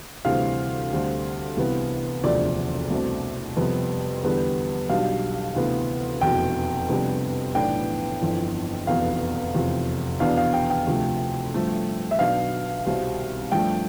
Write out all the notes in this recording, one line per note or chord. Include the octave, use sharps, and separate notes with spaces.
D2 C3 E3 G3 C4 F5
D2 D3 G3 C4
C2 C3 E3 B3
E1 D2 C3 F3 D5
C2 B2 A3 C4
F2 C3 G3 B3
E2 D3 G3 B3
B1 B2 G3 D4 F5
D2 C3 E3 B3
F1 E2 B2 G5
F2 C3 G3 B3 D4
B1 A2 E3 B3 D4 G5
G1 F2 E3
F1 E2 B2 B3 F5
F1 E2 C3 F3
E2 B2 B3 D4 F5
F5
G5
G5
D2 C3 F3 A3
G2 F3 A3 C4
E5
B1 B2 B3 D4 F5
C2 B2 G3 C4
G2 F3 A3 D4 G5